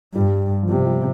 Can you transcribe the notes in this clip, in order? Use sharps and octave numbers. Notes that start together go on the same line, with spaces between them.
G2 G3
F3
C3 G3
G3